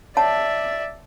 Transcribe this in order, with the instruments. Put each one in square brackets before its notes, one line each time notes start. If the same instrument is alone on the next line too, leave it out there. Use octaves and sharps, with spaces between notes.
[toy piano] C#5 F#5 A5 [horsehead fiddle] D5 E5